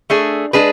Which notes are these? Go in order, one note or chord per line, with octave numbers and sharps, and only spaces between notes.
A3 D4 G#4
G#3 D4 G#4 B4